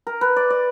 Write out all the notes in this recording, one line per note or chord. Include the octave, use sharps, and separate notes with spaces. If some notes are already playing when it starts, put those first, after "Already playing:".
A#4
B4
D5
D5